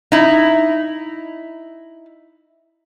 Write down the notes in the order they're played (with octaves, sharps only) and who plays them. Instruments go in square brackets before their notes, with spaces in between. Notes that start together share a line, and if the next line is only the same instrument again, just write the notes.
[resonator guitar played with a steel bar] D#4 E4